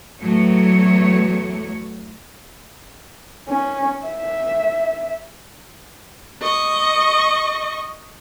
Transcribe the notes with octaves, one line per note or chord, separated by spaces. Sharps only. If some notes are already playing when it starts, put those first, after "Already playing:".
E2 A2 F#3 A3 C#5
C#4
E5
D#5 C#6